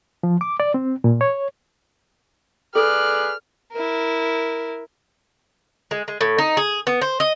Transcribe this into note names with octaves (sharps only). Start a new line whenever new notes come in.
F3
D6
D5
C4
A#2
C#5
G#4 A4 B4 D5 F6
E4 A#4
G#3
G#3
A2
D#4
G#4
B3
C5
D#5